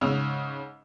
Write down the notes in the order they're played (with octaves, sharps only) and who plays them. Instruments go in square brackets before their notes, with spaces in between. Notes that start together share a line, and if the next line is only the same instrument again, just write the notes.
[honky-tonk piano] G#2 C#3 E6 F7